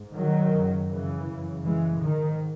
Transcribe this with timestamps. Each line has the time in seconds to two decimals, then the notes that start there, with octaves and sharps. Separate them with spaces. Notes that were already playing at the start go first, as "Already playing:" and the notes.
Already playing: G#2
0.14 D#3 F#3
0.51 F#2 C#3
0.88 C#3 E3
1.26 F#2 C#3
1.63 E3 G#3
2.00 G#2 D#3